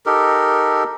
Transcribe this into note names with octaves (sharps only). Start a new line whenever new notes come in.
D#4 G4 A4 A#4